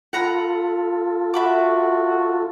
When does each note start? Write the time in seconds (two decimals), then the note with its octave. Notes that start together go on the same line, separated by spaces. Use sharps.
0.13 F4 A4 F#5 A#5 B5
1.34 F#4 E5 B5 D6